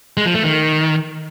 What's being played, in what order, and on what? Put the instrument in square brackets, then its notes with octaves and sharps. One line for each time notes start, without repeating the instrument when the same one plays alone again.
[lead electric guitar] G#3
F3
A3
D#3